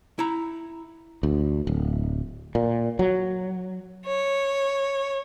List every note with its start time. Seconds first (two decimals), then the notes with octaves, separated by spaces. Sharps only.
0.19 E4 A#5
1.23 D2
1.67 D1
2.55 A#2
2.99 F#3
4.05 C#5